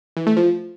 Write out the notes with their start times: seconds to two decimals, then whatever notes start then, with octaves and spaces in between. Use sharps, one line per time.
0.17 E3
0.27 A3
0.37 F3